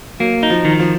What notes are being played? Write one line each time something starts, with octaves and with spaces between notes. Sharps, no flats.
F#3 A#3
D#4
F3
D#3
F3